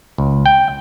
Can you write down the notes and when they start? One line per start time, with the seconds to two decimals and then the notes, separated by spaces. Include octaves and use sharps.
0.18 C#2
0.46 G5